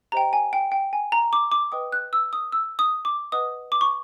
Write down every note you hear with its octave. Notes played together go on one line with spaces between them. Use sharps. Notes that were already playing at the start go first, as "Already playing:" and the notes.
G4 C5 D#5 G5 A#5
G#5
G5
G5
G#5
A#5
D6
D6
B4 D#5 G5 D#6
F#6
E6
D#6
E6
D#6
D6
B4 D#5 F#5 D#6
D6
C#6